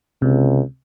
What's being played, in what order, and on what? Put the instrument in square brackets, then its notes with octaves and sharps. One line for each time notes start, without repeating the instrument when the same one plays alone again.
[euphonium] C#2 [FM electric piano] C3